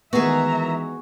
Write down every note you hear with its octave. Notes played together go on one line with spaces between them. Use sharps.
D#3 E3 G#3 B3 F#4 G#4 E5 A#5